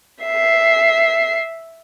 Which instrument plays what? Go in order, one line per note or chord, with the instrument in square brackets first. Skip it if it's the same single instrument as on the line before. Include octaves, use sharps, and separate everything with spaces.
[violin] E5 C7